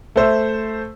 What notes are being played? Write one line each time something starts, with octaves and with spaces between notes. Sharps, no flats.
A3 C5 E5